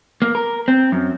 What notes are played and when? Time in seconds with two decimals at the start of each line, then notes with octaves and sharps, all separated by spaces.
0.22 A#3
0.35 A#4
0.68 C4
0.92 F#2